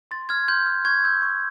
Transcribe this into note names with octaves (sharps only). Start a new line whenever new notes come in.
C6 A6
F6 G#6
C6 G6
F6
C#6 G#6
E6 G6
C#6